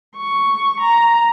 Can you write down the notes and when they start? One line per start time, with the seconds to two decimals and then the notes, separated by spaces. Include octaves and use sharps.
0.17 C#6
0.80 A#5